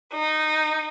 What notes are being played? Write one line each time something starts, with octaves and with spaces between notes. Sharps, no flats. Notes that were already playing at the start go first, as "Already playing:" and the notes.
D#4